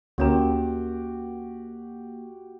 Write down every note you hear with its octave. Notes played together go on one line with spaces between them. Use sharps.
D2 A#3 C#4 F#4 G4 A#4